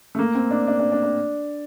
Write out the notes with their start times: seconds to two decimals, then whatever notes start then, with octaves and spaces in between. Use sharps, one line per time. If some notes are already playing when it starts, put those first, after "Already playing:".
0.15 A3
0.19 A#3
0.35 C4
0.51 D4
0.67 D4
0.79 D4
0.92 D4
1.03 D4